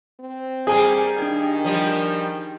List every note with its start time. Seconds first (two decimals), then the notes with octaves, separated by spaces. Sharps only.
0.20 C4
0.67 G3 A#3 G#4 G#5
1.18 D#3 D4 G4 G5
1.64 F3 G3